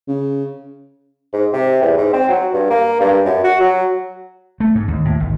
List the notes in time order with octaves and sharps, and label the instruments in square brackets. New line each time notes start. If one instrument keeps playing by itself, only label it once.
[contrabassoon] C#3
[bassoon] G#2
C3
E2
G#2
C4
F#3
G2
A#3
G2
F#2
F#4
F#3
[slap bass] A3
G#2
D#2
A2
G#1